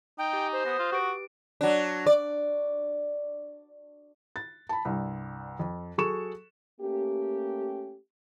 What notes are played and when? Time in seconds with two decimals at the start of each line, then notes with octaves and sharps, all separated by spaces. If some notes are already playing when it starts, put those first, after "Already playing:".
0.18 D#4 G5
0.33 G4 G#5
0.53 C5
0.66 B3 D#6 F#6 A#6
0.79 F4
0.92 F#4 G4 B4 D7
1.61 F#3 D4
2.06 D5
4.36 A6
4.69 A5 B5
4.85 C2 G2
5.59 F2
5.98 F#3 G#4 A4 C#6 E7
6.81 A3 A#3 C#4 G4